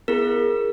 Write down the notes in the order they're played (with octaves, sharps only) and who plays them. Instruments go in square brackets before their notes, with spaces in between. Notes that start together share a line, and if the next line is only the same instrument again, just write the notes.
[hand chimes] B3 E4 G#4 A#4